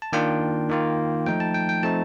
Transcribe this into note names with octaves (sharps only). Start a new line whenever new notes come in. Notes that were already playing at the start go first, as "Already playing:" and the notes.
A5
D#3 A#3 D4 F4 G5
D#3 A#3 F4
F3 A3 D#4 G5
A5
G5
G5
F3 A3 C4 D#4 A5